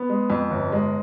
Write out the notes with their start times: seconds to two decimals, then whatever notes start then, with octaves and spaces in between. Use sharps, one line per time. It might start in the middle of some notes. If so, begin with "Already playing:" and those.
Already playing: B3
0.09 G#3
0.30 F2
0.50 G1
0.72 G#3